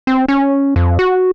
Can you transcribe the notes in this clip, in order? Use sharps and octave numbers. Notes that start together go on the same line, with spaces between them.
C4
C#4
F2
F#4